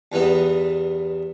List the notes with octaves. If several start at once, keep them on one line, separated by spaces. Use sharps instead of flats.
E2 G2 E3 B3 D#4